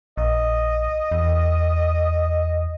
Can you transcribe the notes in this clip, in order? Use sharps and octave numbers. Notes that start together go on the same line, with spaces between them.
A#1 D#5
E2